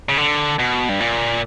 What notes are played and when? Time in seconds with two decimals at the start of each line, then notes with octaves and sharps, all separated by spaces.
0.09 C#3
0.18 D3
0.59 B2
0.89 G2
1.00 A#2